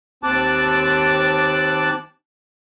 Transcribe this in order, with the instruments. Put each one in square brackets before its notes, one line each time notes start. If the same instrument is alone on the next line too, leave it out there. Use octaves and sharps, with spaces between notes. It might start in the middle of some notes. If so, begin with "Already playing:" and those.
[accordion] D#2 C4 A5 D6 F#6